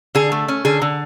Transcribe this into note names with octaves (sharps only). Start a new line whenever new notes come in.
D3 G#4
A3
C#4
D3 G#4
D3